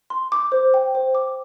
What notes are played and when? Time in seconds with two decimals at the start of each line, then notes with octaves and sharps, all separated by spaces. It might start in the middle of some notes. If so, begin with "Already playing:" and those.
0.10 C6
0.32 D6
0.52 C5
0.74 G5
0.95 C5
1.15 D6